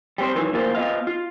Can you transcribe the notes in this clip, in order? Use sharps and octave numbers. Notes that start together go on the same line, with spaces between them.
G3 C4 C5
D#3 E3 F#3
D2 E3 A#3 F4 A#4 C5
B3 F4 D#5 F5
F4